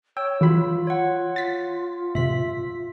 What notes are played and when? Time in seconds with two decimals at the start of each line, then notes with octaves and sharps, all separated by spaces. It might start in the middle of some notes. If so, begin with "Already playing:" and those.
0.17 C#5 G5 E6
0.41 E3 F4 F#4 B5
0.87 C#5 F#5
1.36 F4 A6 B6
2.15 A2 C3 E5 B6